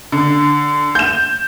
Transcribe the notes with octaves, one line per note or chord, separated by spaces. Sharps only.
D3
G6 E7